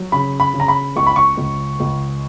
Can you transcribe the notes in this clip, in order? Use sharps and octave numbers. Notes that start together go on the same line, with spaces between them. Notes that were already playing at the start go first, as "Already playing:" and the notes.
Already playing: F#3
C#3 B5
B5
C#3
A#5
B5
C#2 C#6
B5
C#6
C#2
C#2